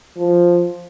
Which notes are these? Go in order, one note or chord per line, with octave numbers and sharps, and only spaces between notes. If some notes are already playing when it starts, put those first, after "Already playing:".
F3